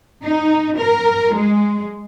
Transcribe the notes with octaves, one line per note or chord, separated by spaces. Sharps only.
D#4
A#4
G#3